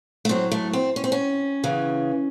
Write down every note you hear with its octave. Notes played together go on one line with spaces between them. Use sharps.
A3
A2 F#3 C4
A3
C4
C#4
C4
C#4
E2 C#3 E3